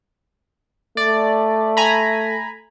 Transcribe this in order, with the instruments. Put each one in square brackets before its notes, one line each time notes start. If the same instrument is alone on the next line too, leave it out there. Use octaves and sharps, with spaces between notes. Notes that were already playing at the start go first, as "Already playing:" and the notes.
[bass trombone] A3 [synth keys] D5
[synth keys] G#5 A#5 B5